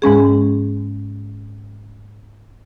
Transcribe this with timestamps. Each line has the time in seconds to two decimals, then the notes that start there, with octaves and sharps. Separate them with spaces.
0.02 G#2 G#3 C#4 G#4